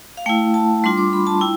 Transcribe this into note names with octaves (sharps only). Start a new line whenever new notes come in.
F5
A3 E4 G5
A5
G3 D4 F4 C6
D6
B5
A5
E4 G5